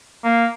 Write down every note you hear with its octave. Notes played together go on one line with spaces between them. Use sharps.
A#3